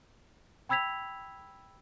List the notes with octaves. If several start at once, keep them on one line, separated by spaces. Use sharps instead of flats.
G5 B5 E6 G#6 B6 F7